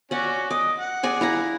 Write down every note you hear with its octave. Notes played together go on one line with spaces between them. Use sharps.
C#4 F#4 D5 F#5
D#5 D6
F#5
G#4 D5 G#5
E4 F5 A#5